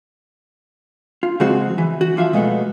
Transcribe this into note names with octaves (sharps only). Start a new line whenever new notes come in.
F4
C#3 F3 G#3 C4 F#4
E3
F#4
E3 F3 F4 E5 F5
B2 G#3 A3 B3